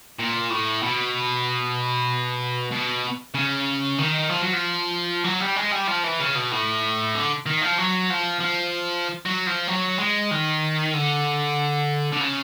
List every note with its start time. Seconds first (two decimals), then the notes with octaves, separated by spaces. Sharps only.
0.19 A#2
0.50 A2
0.82 B2
2.72 B2
3.35 C#3
3.98 D#3
4.29 F3
4.42 F#3
4.53 F3
5.24 F#3
5.41 G3
5.56 G#3
5.72 G3
5.88 F3
6.04 E3
6.20 C#3
6.35 B2
6.52 A2
7.15 D3
7.46 D#3
7.61 F3
7.78 F#3
8.10 F3
8.40 F3
9.25 F#3
9.47 F3
9.67 F#3
9.99 G#3
10.31 D#3
10.94 D3
12.13 D3
12.20 C#3